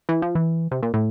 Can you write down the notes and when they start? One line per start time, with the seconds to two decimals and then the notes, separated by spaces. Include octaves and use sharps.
0.09 E3
0.22 F3
0.35 E3
0.71 C3
0.83 A#2
0.94 A2